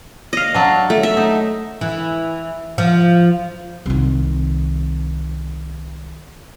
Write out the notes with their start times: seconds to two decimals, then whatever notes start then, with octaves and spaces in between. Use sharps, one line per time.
0.33 D#5 F5
0.54 F#3 D4
0.90 A3
1.03 E5
1.17 D#4
1.81 E3
2.78 F3
3.86 C2 D#3